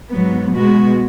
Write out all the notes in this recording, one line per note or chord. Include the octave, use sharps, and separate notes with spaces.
G#2 F#3 B3
B2 G#3 B3 F#4